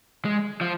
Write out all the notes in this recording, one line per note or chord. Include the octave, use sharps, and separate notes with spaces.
G#3
F3